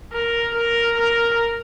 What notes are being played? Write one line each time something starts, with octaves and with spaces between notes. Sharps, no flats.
A#4
A#4
A#4